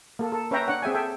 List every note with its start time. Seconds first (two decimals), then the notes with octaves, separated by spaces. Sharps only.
0.19 A#3 A4
0.32 A4
0.51 C#4 B4 C#5 E5 G5 A#5
0.68 D4 C#5 F#5
0.82 C4 G#4 E5 G5 G#5
0.95 A4 E5 G5 G#5